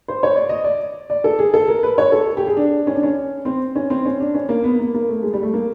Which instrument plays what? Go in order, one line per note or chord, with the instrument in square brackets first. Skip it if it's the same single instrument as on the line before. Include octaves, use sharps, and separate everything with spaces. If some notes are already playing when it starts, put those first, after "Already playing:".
[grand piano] C5
C#5
D5
D#5
D5
D5
A4
G#4
A4
A#4
B4
C#5
A4
G4
G#4
D4
C#4
D4
C#4
C4
C#4
C4
C#4
D4
C#4
A#3
B3
A#3
A#3
A3
G#3
G3
A3
A#3